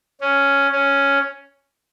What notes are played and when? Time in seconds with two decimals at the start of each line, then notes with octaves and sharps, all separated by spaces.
0.21 C#4
0.72 C#4